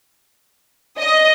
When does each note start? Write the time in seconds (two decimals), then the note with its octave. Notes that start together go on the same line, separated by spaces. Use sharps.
1.00 D#5